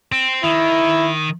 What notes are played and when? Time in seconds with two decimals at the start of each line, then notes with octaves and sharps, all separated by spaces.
0.12 C4
0.44 D#3 E4